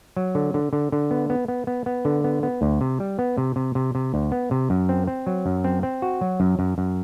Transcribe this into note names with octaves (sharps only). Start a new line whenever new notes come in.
F#3
D3
D3
D3
D3
B3
B3
B3
B3
B3
D3
B3
B3
D2
C3
G3
B3
C3
C3
C3
C3
D2
B3
C3
F#2
C4
C4
F#3
F#2
C4
C4
F#4
F#3
F#2
F#2
F#2